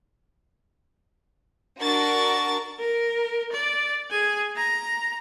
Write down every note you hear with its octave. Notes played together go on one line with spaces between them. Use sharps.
D4 F#4 A#4 C#6 A6
A#4
D5
G#4 G#5
A#5